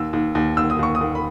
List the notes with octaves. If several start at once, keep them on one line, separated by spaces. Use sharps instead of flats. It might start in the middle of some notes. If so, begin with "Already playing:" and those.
Already playing: D#2 E6
D#2
D#2
D#2 E6
D#6
D#2 C#6
D#6
D#2
B5